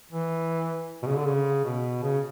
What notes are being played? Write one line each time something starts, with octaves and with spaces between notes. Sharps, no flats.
E3
B2
C#3
D3
C#3
B2
C#3